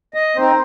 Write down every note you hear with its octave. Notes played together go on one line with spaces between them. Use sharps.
D#5
C4 D#4 C5